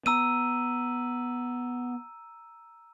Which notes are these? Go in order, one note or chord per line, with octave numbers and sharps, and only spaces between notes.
B3 A#5 E6 D#7